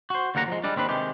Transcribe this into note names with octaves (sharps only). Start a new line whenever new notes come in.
F#4 C5
D#2 D3 A#3 F#5 A#5
F3 G#3
G3 G#3 D4
D#2 C4 D4 B4
C3 D#3 G#3 G4